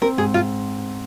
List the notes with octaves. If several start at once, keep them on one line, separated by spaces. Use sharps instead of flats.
C4 A#4
G#2 G#4
G#2 F4